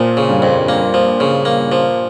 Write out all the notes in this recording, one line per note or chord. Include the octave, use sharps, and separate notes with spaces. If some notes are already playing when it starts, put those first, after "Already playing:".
Already playing: A#2 F3
C#3
G2
F2
A#3
F3
C#3
A#3
F3